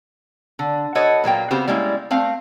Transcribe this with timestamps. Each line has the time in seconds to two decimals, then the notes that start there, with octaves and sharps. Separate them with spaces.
0.59 D3
0.95 F#4 A4 B4 C#5 D#5
1.24 A#2 F#3 A#3 G5
1.51 C#3 B3 C4 F#4 G4 C5
1.68 G3 G#3 A#3 C#4 E4
2.11 A3 C4 F5